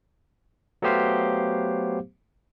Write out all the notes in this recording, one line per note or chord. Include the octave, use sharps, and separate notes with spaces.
F#3 A3 B3 G4 C5 F5